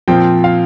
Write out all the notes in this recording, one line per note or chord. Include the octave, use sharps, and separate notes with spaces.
A#2 F3 C4 G5
F5